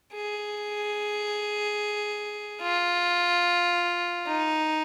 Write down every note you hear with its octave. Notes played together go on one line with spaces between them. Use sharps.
G#4
F4
D#4